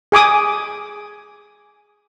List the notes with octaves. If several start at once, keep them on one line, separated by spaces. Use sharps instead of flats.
G#4 G#5 D6 D#6